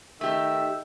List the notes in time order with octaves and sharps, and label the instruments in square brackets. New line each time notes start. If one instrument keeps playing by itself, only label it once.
[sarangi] D#3 [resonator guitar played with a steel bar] A3 G4 [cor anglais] E5